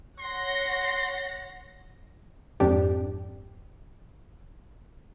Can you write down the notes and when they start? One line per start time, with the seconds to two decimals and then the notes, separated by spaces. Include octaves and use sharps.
0.19 C#5 F#5 C6 A#6
2.60 F2 G#2 D4 G4